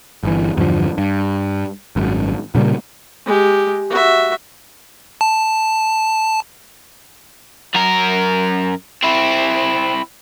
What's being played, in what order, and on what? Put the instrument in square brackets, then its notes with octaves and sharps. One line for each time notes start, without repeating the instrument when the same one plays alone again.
[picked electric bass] G1 E3
E2 G2 D3 F3
G2
G#1 F#2
A#2 C#3 G3 A#3
[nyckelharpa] G#3 G4
F#4 E5
[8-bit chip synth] A5
[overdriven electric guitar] F#2 A#4
C4 E4